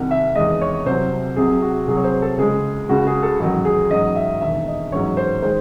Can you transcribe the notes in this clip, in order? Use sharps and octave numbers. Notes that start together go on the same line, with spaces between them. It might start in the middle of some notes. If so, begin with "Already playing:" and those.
Already playing: C2 C3 D#3 F#5
E5
E2 D#3 G#3 D#5
C#5
C2 C3 F#3 C5
C2 C3 F#3 G#4
F#4
C2 C3 F#3 G#4
C#5
C5
A4
C#2 C#3 G#3 G#4
C#2 C#3 G#3 F#4
G#4
A4
A1 G#2 D#3 F#3 G#4
G#4
A1 G#2 F#3 D#5
E5
E1 D#2 D#3 E5
D#5
A1 G#2 F#3 C#5
C5
D#3 G#3 C5